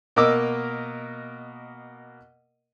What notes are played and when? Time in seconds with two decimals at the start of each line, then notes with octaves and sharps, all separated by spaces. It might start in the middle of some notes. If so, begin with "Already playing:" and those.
0.16 B2 A#3 A#4 D#5 D6 E6